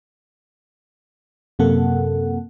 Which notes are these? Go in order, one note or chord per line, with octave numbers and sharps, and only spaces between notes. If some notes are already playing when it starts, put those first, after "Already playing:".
F#2 C3 A#3 A4 F#5